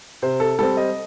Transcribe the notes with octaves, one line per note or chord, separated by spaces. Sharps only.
C3 C5
A4
G3 C4 A4
D#5